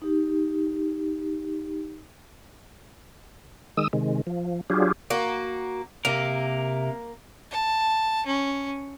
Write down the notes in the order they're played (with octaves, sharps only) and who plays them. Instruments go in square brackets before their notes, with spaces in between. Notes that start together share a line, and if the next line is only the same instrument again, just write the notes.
[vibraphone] D#4 G4
[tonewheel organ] D#3 G#3 D#6 E6
C3 D#3 G#3
F3
F#3 D4 F4 G4 G#4
[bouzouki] A#3 F#4
[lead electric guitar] C3 A#4 [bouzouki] A#3
[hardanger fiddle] A5
C#4